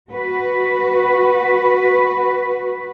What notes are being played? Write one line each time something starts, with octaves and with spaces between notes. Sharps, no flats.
F#4 B4